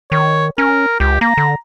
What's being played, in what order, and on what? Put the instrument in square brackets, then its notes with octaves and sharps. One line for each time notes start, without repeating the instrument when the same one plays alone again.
[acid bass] D#3 [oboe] C#5
[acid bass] C#4 [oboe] A#4
[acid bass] C#2 [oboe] G4
[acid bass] A#3 [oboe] A#5
[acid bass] D3